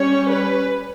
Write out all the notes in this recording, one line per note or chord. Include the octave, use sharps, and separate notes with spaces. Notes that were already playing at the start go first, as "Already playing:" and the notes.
Already playing: G3 C#4 C#5
B4